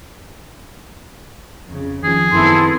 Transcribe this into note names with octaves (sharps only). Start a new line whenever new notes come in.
F2 C#3
D#3 F3 G#4
F#2 D#3 B3 C4 E4 A4 C6